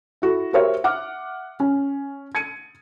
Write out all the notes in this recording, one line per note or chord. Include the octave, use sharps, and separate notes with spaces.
E4 F#4 A4
F#4 G4 A#4 C5 C#5 E5
E5 F#5 D6 F6
C#4
G#6 C#7 D#7